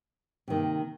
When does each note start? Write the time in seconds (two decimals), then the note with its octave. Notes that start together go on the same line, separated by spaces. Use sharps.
0.48 C3 D#3 A#3